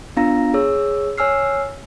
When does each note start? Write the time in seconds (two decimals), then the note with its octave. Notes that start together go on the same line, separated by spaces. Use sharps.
0.17 B3 D4 F4 F5 A#5 A#6
0.54 G#4 C#5 E6
1.18 C#5 G#5 E6 F6 C7